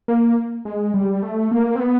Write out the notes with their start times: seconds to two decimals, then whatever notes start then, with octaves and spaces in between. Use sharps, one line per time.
0.08 A#3
0.65 G#3
0.94 G3
1.22 A3
1.51 A#3
1.75 C4
1.80 B3